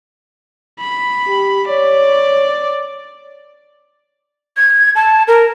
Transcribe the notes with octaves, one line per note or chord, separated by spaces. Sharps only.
B5
G4
C#5 D5
G#6
A5
A#4